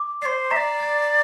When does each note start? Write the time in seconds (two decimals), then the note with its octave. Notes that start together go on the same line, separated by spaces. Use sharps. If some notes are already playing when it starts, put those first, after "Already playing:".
Already playing: D6
0.22 C5 D5 C7
0.51 E5 A#5
0.56 D5
0.80 A6